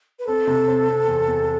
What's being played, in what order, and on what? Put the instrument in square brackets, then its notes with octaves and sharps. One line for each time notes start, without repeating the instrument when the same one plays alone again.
[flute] B4
[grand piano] C4 [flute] A4
[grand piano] C3
C4
C4
E2
E2